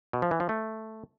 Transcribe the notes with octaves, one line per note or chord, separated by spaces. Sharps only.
B2
F3
E3
F3
A3